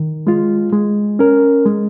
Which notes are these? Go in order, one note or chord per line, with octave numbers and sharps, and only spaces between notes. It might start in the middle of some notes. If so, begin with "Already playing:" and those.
Already playing: D#3
G#3 F4
G#3
C#4 A#4
G#3